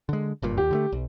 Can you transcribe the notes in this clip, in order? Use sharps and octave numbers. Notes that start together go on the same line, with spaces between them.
D3 G#3
F#1 G2 A#2
D#2 G4
D3 F#3 A3
B1